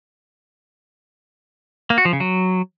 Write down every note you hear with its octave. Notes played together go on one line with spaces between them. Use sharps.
A#3
F#4
F3
C#3
F#3